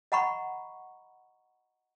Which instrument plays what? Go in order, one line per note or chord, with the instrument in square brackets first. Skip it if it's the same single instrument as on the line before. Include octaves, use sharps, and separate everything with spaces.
[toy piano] D#5 F#5 A#5 B5 C#6